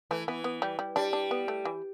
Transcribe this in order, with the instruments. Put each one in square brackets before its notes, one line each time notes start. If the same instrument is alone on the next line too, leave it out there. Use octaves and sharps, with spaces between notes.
[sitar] E3 [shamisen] A3
[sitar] E3 [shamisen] B3
[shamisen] B3
G3
G3
[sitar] G3 [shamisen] D4
[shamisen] D4
B3
A3
E3